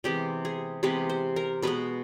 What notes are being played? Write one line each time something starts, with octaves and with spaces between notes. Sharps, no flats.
C3 E3 G#3 B3 G4
G#4
C3 E3 G#3 B3 B4
C5
A#4
B2 G#3 B3 B4